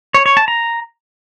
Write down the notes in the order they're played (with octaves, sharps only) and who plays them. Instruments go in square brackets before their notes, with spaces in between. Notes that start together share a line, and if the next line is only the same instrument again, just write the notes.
[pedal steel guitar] C#5
C#5
A5
A#5